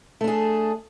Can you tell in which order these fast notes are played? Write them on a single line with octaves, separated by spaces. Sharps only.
A3 D4 G#4